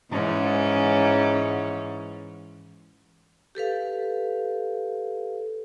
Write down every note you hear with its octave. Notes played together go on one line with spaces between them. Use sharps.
G#2 E3 C#4
G4 A4 B4 F5